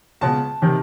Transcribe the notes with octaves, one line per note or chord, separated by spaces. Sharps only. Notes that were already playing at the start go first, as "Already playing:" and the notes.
C#2 B2 A5
C3 D#3